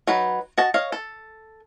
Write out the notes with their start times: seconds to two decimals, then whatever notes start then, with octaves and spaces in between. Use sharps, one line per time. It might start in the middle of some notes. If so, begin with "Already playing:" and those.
0.07 F#3 D#4 B4
0.58 F#4 D#5 A5
0.74 C#5 D#5 F5
0.92 A4